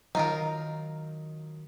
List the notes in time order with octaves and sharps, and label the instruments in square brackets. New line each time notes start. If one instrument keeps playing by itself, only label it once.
[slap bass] D#3 F#3 [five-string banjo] D#4 F4 A#4